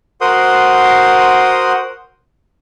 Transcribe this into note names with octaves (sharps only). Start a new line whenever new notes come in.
F#4 A#4 C5 F#5 C6 D#6